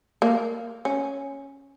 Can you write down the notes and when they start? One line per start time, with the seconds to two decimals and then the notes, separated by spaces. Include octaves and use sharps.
0.22 A#3
0.85 C#4